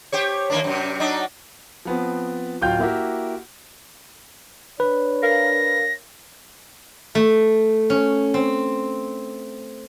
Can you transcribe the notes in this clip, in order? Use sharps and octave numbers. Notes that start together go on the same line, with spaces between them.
G4 C5 C#5
D#3 A#3 D4
F#2 C3
F#3 D4 D#4
F3 B3 C4
D1 F#3 F4 F5 G5 G6
A#3 E4 F#4 G4 A#4
D4 B4 C#5
A#4 F5 A#6
A3
C#4
C4